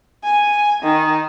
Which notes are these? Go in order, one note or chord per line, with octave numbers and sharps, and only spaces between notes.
G#5
D#3